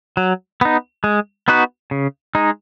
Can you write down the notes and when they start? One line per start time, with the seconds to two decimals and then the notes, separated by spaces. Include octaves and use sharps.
0.17 F#3
0.61 B3 D#4
1.04 G#3
1.48 B3 D#4 F#4 B4
1.91 C#3
2.35 G#3 D#4